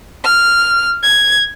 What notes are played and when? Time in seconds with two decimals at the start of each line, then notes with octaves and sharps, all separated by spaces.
0.23 F6
1.02 G#6